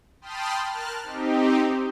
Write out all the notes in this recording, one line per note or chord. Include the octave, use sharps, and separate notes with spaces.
G5 A5 B5 C6 D#6 F6
A#4 A5 F6 F#6
C4 D#4 G4